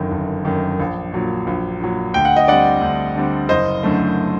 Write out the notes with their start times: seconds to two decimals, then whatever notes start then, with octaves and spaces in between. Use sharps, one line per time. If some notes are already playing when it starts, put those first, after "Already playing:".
Already playing: G1 F#2 D#3
0.11 G1
0.45 F#2 D#3
0.80 A#1
1.13 A#2 F#3
1.47 A#1
1.80 A#2 F#3
2.14 D2 G5
2.25 F#5
2.36 D#5
2.48 D3 G3 C4 D5 F#5
2.82 D2
3.15 D3 G3 C4
3.49 F#1 C5 D#5
3.83 F#2 D3 A3